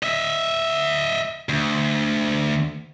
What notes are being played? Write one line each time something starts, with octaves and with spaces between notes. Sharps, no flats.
D#5 E5
D2